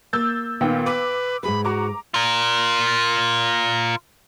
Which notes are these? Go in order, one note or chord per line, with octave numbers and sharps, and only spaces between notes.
A#3 E6 G6 A6
A#2 D#3 B3 G5
B4 D6
G#2 G#4 B4 B5
F#4 A#5 D6
F4 A#4